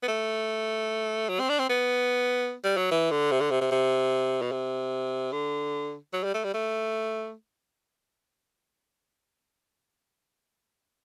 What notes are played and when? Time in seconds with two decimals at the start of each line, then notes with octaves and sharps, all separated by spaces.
0.03 B3
0.08 A3
1.29 F#3
1.40 C4
1.49 D4
1.59 C4
1.69 B3
2.64 G3
2.77 F#3
2.91 E3
3.11 D3
3.31 C3
3.40 D3
3.51 C3
3.61 C3
3.71 C3
4.42 B2
4.52 C3
5.32 D3
6.13 F#3
6.24 G3
6.34 A3
6.44 G3
6.54 A3